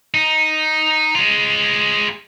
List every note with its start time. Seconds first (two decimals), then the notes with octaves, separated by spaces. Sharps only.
0.14 D#4
1.15 G#3 F4